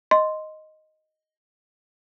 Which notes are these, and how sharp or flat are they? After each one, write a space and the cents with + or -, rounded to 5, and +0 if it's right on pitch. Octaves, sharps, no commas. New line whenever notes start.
D#5 +0 C6 +0